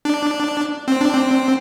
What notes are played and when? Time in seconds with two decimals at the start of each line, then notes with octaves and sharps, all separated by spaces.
0.05 D4
0.88 C4
1.01 D4
1.14 C4